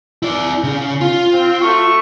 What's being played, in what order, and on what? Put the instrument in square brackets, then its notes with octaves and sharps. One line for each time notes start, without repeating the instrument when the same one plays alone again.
[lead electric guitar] E4 D5
C#3
F4
[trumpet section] C4
A3 F#4 C#6